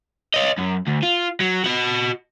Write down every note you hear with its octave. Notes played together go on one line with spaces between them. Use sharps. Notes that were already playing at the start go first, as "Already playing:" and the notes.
C#5 D#5
F#2
D2
F4
F#3
F#4 D#5